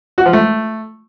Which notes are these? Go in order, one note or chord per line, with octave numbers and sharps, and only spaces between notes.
F#4
F3
A3